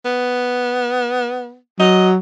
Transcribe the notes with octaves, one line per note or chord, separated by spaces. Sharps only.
B3
F#3 D#5